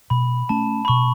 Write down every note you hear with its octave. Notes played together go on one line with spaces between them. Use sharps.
B2 B5
A3 C#4 A5
B5
B2 C#6